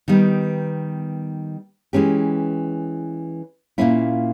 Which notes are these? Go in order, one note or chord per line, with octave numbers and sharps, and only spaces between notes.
D#3 G3 B3 D#4
E3 G#3 C#4 G4
A#2 A#3 C#4 E4